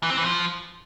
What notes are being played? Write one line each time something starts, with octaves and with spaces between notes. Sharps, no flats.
E3
C4
E3
F3